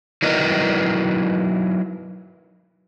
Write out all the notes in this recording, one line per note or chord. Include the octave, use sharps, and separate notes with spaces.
F#3 D#4 E4 A#4 B4 D#5